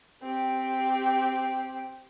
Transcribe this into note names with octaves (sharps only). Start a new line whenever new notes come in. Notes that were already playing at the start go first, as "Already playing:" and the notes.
C4 G4